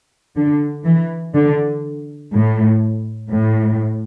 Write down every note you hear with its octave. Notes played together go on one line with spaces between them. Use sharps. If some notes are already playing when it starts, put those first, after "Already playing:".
D3
E3
D3
A2
A2